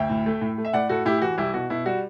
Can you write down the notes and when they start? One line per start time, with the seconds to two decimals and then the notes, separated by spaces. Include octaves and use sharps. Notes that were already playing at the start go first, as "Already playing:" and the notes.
Already playing: D2 E5 G5
0.09 A2
0.26 A3
0.41 A2
0.58 A3
0.65 E5
0.73 A2 D5 F#5
0.89 A2 F#4 A4
1.05 A2 E4 G4
1.18 G4
1.21 E3 F#4
1.38 C2 E4 G4
1.54 B2 F#4
1.70 B2 E4
1.86 G3 F#4